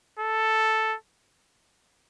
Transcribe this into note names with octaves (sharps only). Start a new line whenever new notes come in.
A4